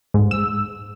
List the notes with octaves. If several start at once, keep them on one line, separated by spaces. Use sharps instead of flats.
G#2
E6